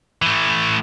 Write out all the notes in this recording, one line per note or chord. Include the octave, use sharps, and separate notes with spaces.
E3 A3